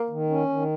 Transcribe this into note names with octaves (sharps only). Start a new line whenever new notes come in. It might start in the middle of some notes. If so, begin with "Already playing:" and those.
Already playing: A#3
D#3
C#4
D#3